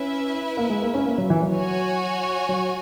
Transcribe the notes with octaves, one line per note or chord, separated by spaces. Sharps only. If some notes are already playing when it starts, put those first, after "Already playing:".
Already playing: C#4 E4 B4 E5
A#3
G#3
A#3
C#4
A#3
F#3
E3
F#3
F#4 C#5 G#5
F#3